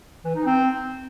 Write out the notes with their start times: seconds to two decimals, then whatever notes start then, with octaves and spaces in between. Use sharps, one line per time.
0.24 E3
0.35 D#4
0.46 C4